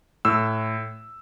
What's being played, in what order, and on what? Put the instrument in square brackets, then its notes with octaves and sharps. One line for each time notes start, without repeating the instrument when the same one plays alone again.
[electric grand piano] A2 E6